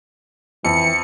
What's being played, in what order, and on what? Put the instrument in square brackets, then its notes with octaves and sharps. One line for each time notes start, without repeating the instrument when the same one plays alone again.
[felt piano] F2 [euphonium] E3 [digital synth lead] C#7